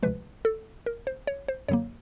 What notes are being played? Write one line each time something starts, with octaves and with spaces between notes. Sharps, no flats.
D2 C3 F3 G#3 B4
A4
A#4
C5
C#5
C5
F#2 D3 F#3 A#3 C#5